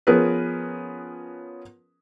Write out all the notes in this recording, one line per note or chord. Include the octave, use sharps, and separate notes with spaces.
F3 B3 C#4 G#4 A#4 B4